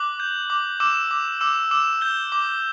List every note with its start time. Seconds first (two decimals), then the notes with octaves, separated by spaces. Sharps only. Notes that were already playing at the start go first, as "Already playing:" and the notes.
Already playing: D6 F#6 F#7
0.20 G6
0.50 D6
0.80 D6 E6 E7
1.11 D6
1.41 D6 E6 E7
1.71 D6 E6 E7
2.01 G6 G7
2.32 D6